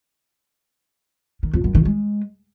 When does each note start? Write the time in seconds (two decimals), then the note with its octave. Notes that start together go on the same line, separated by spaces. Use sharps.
1.43 D#3
1.53 F2
1.64 F#2
1.75 D#3
1.85 G#3